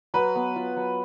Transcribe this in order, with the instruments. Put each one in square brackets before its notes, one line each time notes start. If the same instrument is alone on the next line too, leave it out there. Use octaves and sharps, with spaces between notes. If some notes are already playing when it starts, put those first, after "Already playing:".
[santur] F#3 [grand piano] B4
[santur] B3
F4
F#3